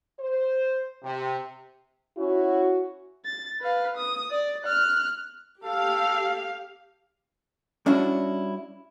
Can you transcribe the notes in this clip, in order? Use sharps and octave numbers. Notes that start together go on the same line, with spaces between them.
C5
C3
C#4 E4 F#4
A6
B4 F5
D#6
D5
F6 F#6
G4 A4 F5
G3 C#4 D4 E4 F#4